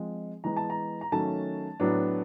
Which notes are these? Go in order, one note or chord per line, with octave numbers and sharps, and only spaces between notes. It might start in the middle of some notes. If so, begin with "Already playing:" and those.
Already playing: F3 G#3 C4
E3 G#3 B3 A#5
A5
A#5
A#5
D#3 F#3 A3 C#4 A5
A2 F#3 B3 D4